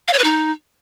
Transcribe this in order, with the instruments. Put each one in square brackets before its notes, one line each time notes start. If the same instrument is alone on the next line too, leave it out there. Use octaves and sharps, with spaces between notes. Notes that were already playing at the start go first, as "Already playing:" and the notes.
[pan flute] F5
C#5
B4
D#4